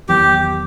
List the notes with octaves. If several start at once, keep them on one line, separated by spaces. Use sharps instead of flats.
E2 D#3 F#3 B3 G4